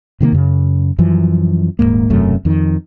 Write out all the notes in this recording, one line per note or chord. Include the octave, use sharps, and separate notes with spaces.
C3 D#3 G3 A#3
F#2 C#3
F#2 E3 F3
D#1 F2 G#2 A#3
E1 F#2 C3 A3
F2 D#3